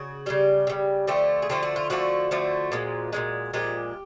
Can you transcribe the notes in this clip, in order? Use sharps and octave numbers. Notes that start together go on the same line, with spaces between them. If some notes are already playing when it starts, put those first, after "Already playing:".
Already playing: C#3 F#4
C#3 E3 G3 G4
C#3 E3 G3
D3 F3 A3 G4
G#4
D3 F3 A3 G4
F#4
F4
D3 F3 A3 F#4
D3 F3 A3
A#2 F3 G#3
A#2 F3 G#3
A#2 F3 G#3 G4